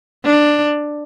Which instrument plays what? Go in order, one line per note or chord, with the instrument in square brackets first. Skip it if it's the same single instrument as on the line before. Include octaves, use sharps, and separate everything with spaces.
[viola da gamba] D4